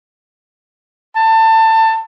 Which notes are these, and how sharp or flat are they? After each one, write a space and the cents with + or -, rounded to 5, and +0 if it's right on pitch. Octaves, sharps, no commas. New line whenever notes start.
A5 +25